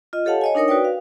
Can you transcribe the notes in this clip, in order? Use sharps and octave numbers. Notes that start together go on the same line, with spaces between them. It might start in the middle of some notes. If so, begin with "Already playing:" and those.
F4 D#5
G4 A4 C#5 F5 F#5 A5
C#5 D#5 G#5
D4 D#4 A#4 C#5 D#6
F#4 B4 D5 G5
F5